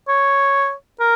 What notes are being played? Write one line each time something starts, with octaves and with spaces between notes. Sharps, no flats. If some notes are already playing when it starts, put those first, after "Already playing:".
C#5
A#4